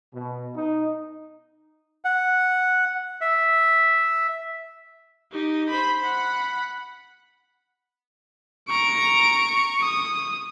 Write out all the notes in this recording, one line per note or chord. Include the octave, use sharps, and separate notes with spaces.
B2
D#4
F#5
E5
D#4 G4
C5 B5
F#5 B5
A#5 C#6 D7
D#6